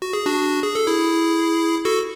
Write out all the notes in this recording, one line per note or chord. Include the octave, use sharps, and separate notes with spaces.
F#4
G#4
D4 F#4
G#4
A4
E4 G#4
F#4 A4